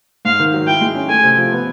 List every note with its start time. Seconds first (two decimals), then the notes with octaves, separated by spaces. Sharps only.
0.25 G#2 F5
0.39 D#3
0.54 F#3
0.67 E4 G5
0.81 G#3
0.95 C#4
1.09 A3 G#5
1.23 C3
1.37 F3
1.52 B3